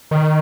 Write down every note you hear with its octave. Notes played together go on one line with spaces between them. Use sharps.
D#3